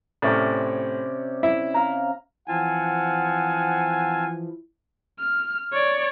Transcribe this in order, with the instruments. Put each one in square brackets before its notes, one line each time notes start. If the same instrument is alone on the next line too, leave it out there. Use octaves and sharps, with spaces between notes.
[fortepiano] A2 [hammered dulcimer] C3 C#4 D5
[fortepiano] E4 E5
[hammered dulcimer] F5 A#5
[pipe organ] E3 F3 [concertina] C4 F5 A5 [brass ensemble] F#5 [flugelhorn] G#5
[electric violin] F6
C#5 D5